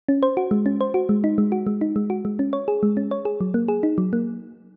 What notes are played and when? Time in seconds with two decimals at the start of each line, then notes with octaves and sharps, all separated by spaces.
0.08 C#4
0.23 C5
0.37 F#4
0.51 G#3
0.66 C#4
0.81 C5
0.94 F#4
1.09 G#3
1.24 D#4
1.38 G#3
1.52 F#4
1.67 G#3
1.81 D#4
1.96 G#3
2.10 F#4
2.25 G#3
2.39 C#4
2.53 C#5
2.68 G#4
2.83 G#3
2.97 C#4
3.11 C#5
3.25 G#4
3.41 F#3
3.54 A#3
3.68 G#4
3.83 D#4
3.98 F#3
4.13 A#3